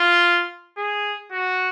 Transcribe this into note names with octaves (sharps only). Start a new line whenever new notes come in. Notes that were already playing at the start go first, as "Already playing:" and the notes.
Already playing: F4
G#4
F#4